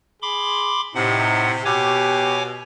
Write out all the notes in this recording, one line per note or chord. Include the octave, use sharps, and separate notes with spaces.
G#4 B5 C6 D6
A2 C3 D#4 F#5
B2 G4 C#5 G#5 D6